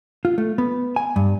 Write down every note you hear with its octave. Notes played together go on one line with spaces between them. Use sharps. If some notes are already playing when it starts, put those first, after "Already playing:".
F4
A3
B3
G#5
G2